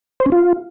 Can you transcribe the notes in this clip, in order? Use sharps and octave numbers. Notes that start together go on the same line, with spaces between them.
C5
C#4
F4